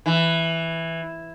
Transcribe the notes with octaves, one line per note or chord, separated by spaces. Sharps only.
E3